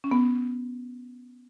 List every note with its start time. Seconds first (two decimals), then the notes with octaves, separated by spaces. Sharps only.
0.04 C#4
0.11 B3